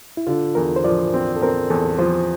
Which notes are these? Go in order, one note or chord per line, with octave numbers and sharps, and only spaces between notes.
E4
D3 F4
E2 A#4
C5
F3 D5
C4
A4
C4 A#4
E2 A4
F3 C5